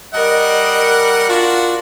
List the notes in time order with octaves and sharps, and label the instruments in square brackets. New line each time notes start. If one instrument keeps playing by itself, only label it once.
[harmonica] G3 F#5 [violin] A#4 [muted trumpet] D#5
[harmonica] D4 F#4 [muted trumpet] F4